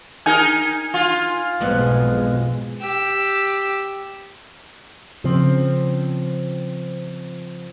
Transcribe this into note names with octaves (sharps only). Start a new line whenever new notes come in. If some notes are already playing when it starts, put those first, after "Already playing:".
D#4 A#4 G#5
F4
B1 F2 G#2 B2 G#3 B3
G4 E6
C#3 F3 C4